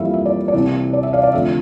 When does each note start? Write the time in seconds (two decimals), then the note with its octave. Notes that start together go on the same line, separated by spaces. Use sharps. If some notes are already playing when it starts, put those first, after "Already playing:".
Already playing: F2 E3 G3 A#3 E5 F5
0.14 E5
0.26 D5
0.48 D5
0.54 C2 C3 E3
0.93 D5
1.03 E5
1.13 D5 F5
1.23 D5
1.33 F2 D3 A3 E5